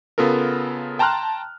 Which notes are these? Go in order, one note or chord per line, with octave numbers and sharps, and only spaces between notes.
C#3 B3 F4 A4 A#4
G5 A5 A#5 C6 F6 F#6